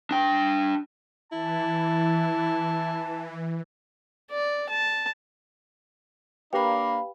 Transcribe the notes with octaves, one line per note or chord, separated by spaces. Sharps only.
D4 G5
E3 E4 A5
D5
A5
A#3 D4 G4 B4 F5 G5 B5